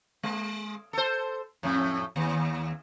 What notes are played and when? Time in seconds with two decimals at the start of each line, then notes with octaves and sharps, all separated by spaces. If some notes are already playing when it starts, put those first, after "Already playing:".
0.23 G#3
0.93 A4 C5
1.63 F2 A2
2.16 D#2